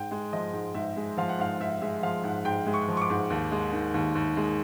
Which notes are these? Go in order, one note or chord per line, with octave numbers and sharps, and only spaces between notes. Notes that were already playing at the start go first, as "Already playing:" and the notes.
Already playing: G#2 G5
G#3
F3 D#5
G#2
G#2 E5
G#3
F3 F5
F#5
G#2 F5
G#2 E5
G#3 E5
F3 F5
G#2 F#5
G#2 G5
G#3
C#6
F3
C#6
D6
G#2
D#2
G#3
D#3
D#2
D#2
G#3